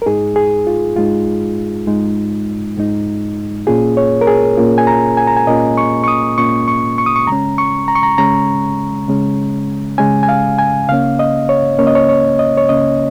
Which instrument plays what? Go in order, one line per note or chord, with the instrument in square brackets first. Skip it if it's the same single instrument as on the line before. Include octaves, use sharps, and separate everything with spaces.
[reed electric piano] A#4
G#2 G#3 D#4 G#4
G#4
F4
G#2 G#3 D#4 F4
G#2 G#3 D#4
G#2 G#3 D#4
A#2 A#3 C#4 F4 G#4
C#5
A#4
G#4
A#2 A#3 C#4 F4
G#5
A#5
G#5
A#5
G#5
A#2 A#3 C#4 F4 D#5
C#6
C#6
D#6
A#2 A#3 C#4 F4 C#6
C#6
C#6
D#6
C#6
C#3 G#3 C#4 A#5
C#6
A#5
C#6
A#5
C#3 G#3 C#4 A#5
C#3 G#3 C#4
C#3 G#3 C#4 G#5
G#5
F5
G#5
C#2 C#3 A#3 C#4 F5
D#5
C#5
C#2 C#3 A#3 C#4 C#5
D#5
C#5
C#5
D#5
C#5
C#2 C#3 A#3 C#4 D#5